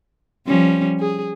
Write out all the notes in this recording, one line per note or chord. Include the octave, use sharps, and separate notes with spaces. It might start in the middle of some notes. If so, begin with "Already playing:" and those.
F3 G3 C#4
G#4